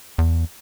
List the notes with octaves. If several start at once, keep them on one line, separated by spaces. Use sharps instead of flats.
E2